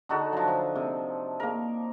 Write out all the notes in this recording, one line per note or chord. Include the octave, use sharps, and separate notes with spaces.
D3 D#4 F#4 A4
F3 F#3
F3
C3
A#3 A#4